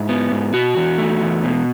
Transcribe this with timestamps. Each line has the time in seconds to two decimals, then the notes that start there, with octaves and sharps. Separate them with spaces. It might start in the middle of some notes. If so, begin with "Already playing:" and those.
Already playing: G#2 E4
0.09 B3
0.32 G#2
0.54 B2 F#4
0.77 E2
0.98 A3
1.21 E2
1.44 B2